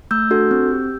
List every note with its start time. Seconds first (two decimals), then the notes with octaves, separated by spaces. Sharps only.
0.11 A3 E6 G6
0.31 D4 F#4 A4
0.51 C4
0.71 G4